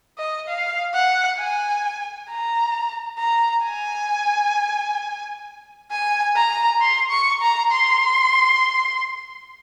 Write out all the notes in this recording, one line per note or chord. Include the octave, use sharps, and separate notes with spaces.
D#5
F5
F#5
G#5
A#5
A#5
G#5
G#5
A#5
C6
C#6
A#5
C6